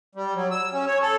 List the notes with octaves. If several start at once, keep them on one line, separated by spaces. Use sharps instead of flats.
G3
F#3
E6
C#4
C#5
A4